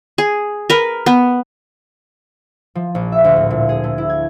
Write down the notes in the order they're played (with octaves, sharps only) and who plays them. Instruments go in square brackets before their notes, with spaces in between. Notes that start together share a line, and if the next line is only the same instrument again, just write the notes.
[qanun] G#4
A#4 B4
B3
[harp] F3
A#1
E5
D2
A2
A#2
G#4
A3
E4
G#6